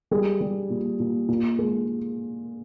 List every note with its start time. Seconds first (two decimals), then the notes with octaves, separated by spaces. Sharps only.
0.11 G3 G#4
0.41 G3
0.70 A#2
1.00 A#2
1.28 A#2
1.59 G#3